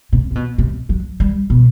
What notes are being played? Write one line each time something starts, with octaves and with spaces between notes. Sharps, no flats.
C3
C3
B2
C3
F#3
G3
B2